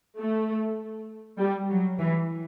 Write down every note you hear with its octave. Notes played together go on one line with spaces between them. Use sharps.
A3
G3
F#3
E3